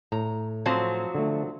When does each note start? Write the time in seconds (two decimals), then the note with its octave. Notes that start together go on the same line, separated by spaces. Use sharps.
0.12 A2 A#5
0.66 F3 F#3 C4
1.15 D3 A3